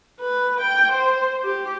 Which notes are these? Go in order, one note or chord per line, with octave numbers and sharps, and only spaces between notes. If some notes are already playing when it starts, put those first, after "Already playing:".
B4
G5
C5
G4